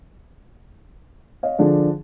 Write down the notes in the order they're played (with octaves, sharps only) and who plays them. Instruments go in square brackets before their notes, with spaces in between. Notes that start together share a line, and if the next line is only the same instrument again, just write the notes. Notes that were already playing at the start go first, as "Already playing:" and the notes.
[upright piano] C#5 D#5 F5
D3 F3 D4 G#4